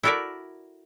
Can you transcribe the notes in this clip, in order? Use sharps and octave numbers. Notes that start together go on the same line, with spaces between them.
E4 F#4 A4 A#4 D5 E5